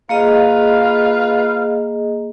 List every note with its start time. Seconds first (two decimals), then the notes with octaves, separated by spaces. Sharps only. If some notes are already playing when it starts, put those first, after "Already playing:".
0.09 A#3 F4 G#4 B4 D#5 F5